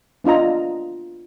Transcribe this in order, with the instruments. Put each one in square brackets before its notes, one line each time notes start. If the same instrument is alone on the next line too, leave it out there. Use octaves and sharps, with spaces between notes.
[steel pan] B3 D4 F4 D#5 A#5